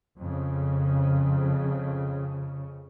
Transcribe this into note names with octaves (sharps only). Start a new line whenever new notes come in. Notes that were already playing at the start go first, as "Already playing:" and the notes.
F2 C#3